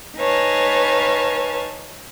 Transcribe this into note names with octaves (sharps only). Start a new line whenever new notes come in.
D#4 B4 C#5 F5 G#5 A5